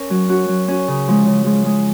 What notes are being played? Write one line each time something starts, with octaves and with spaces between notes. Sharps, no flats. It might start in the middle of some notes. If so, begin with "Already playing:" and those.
Already playing: C#4 A#4
F#3
C#4 F#4
F#3
C#4 F#4
C#3
F3 G#3
C#3
F3 G#3
G#3